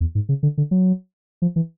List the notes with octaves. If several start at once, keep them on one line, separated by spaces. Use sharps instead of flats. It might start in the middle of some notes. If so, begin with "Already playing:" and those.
E2
G#2
C#3
D3
D3
F#3
F3
E3